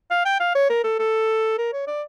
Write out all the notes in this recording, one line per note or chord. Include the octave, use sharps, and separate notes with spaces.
F5
G5
F5
C#5
A#4
A4
A4
A#4
C#5
D5